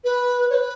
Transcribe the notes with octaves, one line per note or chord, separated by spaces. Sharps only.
B4
C#5
B4